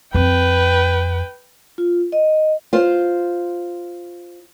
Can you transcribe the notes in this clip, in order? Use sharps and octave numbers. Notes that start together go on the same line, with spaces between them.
F2 C4 B4 G5
F4
D#5
F4 C5